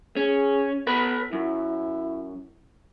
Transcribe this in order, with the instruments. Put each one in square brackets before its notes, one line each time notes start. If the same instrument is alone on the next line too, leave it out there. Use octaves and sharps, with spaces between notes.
[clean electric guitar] C#4 [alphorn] G#4
[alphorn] B3 [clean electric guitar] A4 B4 B5
[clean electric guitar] F#2 [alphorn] E4